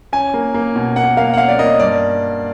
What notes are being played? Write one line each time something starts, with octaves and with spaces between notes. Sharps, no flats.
C#4 G#5
A#3
A#3
B2
A#3 F#5
A#3 F5
F#5
C#4 F5
D5
A#3 D#5
G2 D5